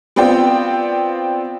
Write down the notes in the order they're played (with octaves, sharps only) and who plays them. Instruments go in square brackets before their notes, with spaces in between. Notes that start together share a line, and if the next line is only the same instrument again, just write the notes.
[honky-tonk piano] B3 C4 F4 D5 G5